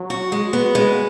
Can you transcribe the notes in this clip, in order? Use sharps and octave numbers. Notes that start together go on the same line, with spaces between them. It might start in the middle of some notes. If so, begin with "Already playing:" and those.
Already playing: F#3
F#4
G#3
B3
G#3